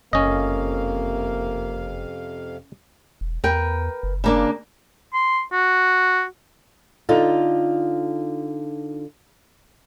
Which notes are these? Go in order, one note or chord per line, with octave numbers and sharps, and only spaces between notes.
F#1 F2 C3 A#3 C#4 D#5 F5
E1
E2 A#4 B4 G5
F#1
C#3 A#3 D4
C6
F#4
D3 D#4 F4